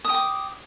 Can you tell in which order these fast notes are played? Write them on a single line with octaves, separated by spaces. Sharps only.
D#6 G5 D6